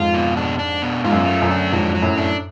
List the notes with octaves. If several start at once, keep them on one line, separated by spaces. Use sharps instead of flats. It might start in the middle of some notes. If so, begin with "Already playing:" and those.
Already playing: F2 G#2 F4
B2
D4
D4
B2
G#2 F4
F#2
A3
F#2
D4
F2 G#2 F#3
F#3
F#2 A2
D4